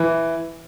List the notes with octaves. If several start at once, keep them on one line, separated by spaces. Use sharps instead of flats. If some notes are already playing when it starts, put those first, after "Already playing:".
Already playing: E3